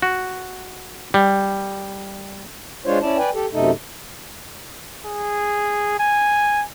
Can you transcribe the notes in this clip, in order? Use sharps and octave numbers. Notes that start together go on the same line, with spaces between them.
F#4
G3
G#3 D4 F4 C5 C#5
C#4 E4 D5 A5
B4 D5 G5 G#5
G4 A4
F#2 C3 A3 D#4 A4
G#4
G#5